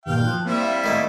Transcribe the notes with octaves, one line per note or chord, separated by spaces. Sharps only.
G2 A#2 D#3 F5 G5
F3 F#6
G3 A#3 C4 E4 E5
F5
D#3 A3 A#3 B6